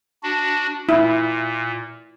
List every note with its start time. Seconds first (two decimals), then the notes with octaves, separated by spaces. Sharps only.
0.23 D4 F#4
0.89 A#2 E4